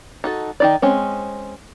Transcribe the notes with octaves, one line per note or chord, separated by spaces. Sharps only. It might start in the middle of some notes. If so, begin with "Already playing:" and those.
D#4 F#4 A4
D#3 D#4 D5
G#3 C4 C#4